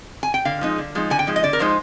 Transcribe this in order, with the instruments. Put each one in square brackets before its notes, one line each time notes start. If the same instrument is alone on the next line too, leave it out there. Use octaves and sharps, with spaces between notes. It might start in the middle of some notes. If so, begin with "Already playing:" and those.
[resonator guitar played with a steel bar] G#5
G5
D3 F5
F3 G#3 D#4
D3
F3 G#3 D#4
D3 G#5
G5
F3 G#3 D#4
D#5
D3 D5
A#4
F3 G#3 D#4 C5